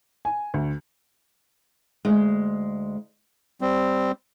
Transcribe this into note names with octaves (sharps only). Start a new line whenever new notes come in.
G#5
D2
D2 G#3
G3 C4